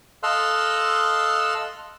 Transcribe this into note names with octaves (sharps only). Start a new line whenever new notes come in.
A4 D#5 F5 C6 E6 F#6